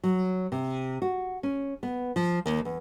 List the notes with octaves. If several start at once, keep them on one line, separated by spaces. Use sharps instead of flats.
F#3
C3
F#4
C#4
B3
F3
D#2
E2